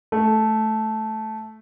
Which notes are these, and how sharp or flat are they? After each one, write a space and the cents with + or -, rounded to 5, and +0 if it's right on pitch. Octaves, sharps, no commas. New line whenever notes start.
A3 -10